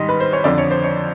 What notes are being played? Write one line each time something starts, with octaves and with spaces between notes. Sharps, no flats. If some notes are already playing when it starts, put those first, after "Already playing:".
Already playing: G#2 D#3 G3 D#5
B4
C5
C#5
F2 D3 F3 D5
C#5
C5
C#5